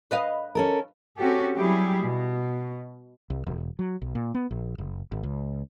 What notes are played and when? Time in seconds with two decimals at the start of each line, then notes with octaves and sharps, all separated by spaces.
0.11 B4 D#5 F5
0.55 C#4 A4 A#4
1.18 C4 C#4 F#4 G4 A4
1.57 F#3 G3 E4 G4 G#4
2.05 B2
3.30 C2
3.47 E1
3.79 F#3
4.02 B1
4.15 A#2
4.34 B3
4.51 A#1
4.78 F#1
5.12 G#1
5.23 C#2